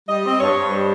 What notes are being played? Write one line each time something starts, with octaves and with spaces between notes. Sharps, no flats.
G3 D#5
C4
G2 C#5
G2
G3 C5